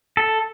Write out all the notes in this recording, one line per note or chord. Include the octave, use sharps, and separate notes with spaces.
A4